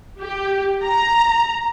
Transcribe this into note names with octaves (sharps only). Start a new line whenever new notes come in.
G4
A#5